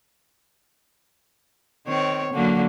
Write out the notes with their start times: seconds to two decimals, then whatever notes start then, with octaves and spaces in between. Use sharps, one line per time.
1.87 D#3 C4 C#5
2.34 D3 F#3 A#3